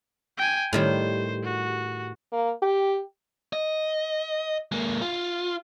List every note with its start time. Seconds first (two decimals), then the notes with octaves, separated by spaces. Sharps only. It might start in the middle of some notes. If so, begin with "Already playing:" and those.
0.38 G5 G#5
0.73 A2 D#3 G3 C5
1.44 F#4
2.32 A#3
2.62 G4
3.53 D#5
4.72 G#3 A#3
5.02 F4